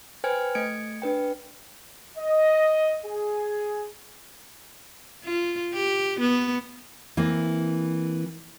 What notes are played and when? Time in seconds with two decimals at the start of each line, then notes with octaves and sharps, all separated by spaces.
0.24 B4 C5 G5 G#5 F6 G#6
0.55 A3 G#6 C#7 D7
1.02 D4 B4 G5
2.18 D#5
3.06 G#4
5.24 F4
5.73 G4
6.20 B3
7.17 E3 A#3 C4